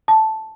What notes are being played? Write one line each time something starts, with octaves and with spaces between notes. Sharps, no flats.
A5